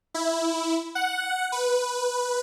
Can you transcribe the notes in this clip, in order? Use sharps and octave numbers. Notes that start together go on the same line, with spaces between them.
E4
F#5
B4